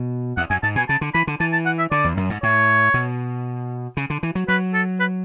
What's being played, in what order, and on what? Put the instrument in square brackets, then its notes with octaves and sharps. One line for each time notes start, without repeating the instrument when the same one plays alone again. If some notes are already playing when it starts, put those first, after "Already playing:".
Already playing: [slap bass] B2
[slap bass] E2 [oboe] F#5
[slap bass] F#2 [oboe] G#5
[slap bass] G#2 [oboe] A5
[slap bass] B2 [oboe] G#5
[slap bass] C#3 [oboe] A5
[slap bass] D3
[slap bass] E3 [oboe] B5
[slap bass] D3
[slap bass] E3 [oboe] A5
[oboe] A5
F#5
E5
[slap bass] D3 [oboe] D5
[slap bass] E2
F#2
G#2
[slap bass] A2 [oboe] C#5
[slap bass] B2
C#3
D3
E3
F#3
[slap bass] F#3 [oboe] B4
[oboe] A4
B4